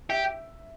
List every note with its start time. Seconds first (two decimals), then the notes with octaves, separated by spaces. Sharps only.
0.09 G4 E5